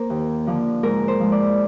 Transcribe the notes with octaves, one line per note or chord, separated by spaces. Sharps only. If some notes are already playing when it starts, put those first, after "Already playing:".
Already playing: A#3 A#4 C5
D#2
D3 F3 A#3
G#2 A#4
C5
F3 G#3
D5